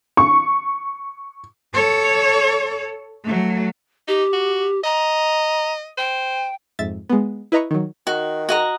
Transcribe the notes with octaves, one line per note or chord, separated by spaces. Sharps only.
C#6
A4 C#5
F#3 A3
D#4 G4
F#4
D#5 A#5
C5 G5
F2 G#2 E5 A6
G#3 B3
E4 B4 D#5 A#5 B5 C#6
D#3 F#3
D#3 F#4
F#4 D#5 A#5